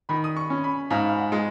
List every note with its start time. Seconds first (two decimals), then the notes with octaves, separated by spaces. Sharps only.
0.09 D#3 B5
0.24 D#6
0.37 C#6
0.50 C#4
0.64 B5
0.91 G#2 F5
1.09 F5
1.18 F#5
1.32 G#3